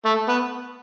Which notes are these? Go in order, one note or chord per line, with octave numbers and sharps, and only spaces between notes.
A3
B3